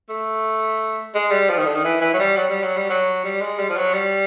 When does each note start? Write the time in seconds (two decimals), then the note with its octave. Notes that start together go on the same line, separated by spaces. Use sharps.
0.09 A3
1.14 G#3
1.31 G3
1.49 F3
1.58 D#3
1.66 D3
1.75 D#3
1.84 E3
2.01 E3
2.14 F#3
2.19 G3
2.37 F#3
2.49 G3
2.64 F#3
2.77 G3
2.90 F#3
3.24 G3
3.41 G#3
3.59 G3
3.69 F3
3.77 F#3
3.93 G3